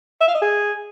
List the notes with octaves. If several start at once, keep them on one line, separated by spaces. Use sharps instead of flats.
E5
F5
D#5
G#4